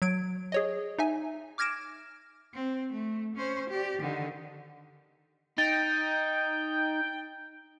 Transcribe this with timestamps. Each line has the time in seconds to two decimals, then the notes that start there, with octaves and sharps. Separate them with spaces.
0.02 F#3 G#6 D7
0.52 G#4 C#5 D#5
0.98 D#4 E5 G#5
1.58 D6 F6 G#6 A#6 D7 E7
2.53 C4
2.92 A3
3.35 C#4 C5
3.70 G4 D5
4.00 D3 D#3
5.58 D#4 G5 A6